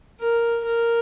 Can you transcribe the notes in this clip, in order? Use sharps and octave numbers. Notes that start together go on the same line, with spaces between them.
A#4
A#4